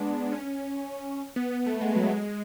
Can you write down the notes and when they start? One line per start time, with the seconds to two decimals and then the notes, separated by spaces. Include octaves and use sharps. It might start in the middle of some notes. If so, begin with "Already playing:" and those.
Already playing: G#3 B3 D4
0.32 C#4
1.36 B3
1.52 B3
1.66 A3
1.81 G#3
1.96 F#3
2.04 A3
2.10 G#3